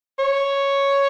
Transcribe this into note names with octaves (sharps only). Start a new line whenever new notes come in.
C#5